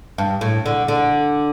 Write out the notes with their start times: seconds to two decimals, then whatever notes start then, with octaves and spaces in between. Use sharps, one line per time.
0.18 G2
0.41 A2
0.66 D3
0.88 D3